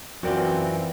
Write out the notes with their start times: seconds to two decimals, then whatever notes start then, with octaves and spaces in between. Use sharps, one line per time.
0.23 F#2 E3 C4 F4 F#4 A#4 D5